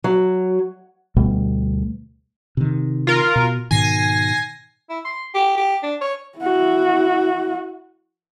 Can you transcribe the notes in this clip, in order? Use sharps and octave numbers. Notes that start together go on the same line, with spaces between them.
F#3
D2 B2 G3 A3
C3 D#3
F4 A#4
B2
G#2 B2 D#3 G#5 A#6 C7
E4
C6
G4
G4
D4
C#5
E4 F#4